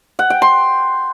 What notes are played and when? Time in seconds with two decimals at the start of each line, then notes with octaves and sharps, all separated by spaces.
0.19 F#5
0.30 G5
0.42 C6